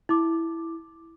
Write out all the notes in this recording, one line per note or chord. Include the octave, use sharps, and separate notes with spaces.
E4 D6